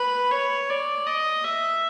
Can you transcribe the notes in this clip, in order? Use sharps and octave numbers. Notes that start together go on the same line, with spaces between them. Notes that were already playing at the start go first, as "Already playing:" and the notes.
Already playing: B4
C#5
D5
D#5
E5